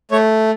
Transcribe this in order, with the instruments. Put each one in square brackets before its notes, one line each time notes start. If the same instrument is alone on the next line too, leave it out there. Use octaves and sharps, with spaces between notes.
[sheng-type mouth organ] A3 C#5